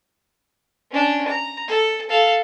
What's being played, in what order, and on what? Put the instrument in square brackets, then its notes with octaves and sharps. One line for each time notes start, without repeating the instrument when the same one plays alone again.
[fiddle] C#4 D4
A#5
A4
A4 F5